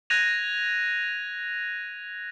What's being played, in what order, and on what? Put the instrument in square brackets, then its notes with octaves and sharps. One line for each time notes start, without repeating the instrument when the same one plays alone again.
[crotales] F#6 G#6 A#6 D#7 F7